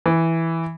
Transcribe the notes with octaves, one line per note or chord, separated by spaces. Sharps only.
E3